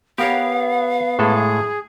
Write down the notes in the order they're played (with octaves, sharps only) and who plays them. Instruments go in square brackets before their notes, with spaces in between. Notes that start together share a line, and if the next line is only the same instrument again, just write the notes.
[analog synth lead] B3 [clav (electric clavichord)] G4 A#4 C#5 [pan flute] F5
[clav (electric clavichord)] A2 G#3 A4 [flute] G#4